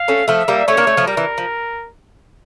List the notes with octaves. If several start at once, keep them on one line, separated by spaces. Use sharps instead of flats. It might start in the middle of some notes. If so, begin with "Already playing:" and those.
Already playing: F5
A3 C#4
F3 A3 E5
G3 A#3
A3 C#4 C#5
A#3 D4
A3 C#4
F3 A3
G3 A#4
E3
F3